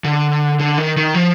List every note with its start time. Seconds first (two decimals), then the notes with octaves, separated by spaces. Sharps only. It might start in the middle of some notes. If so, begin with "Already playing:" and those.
0.04 D3
0.59 D3
0.77 D#3
0.97 D#3
1.14 F3